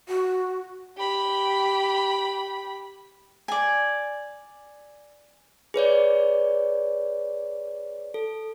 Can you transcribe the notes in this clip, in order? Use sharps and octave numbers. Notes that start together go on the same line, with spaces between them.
F#4
G4 B5
D5 G#5
G#4 B4 C#5 D5
A4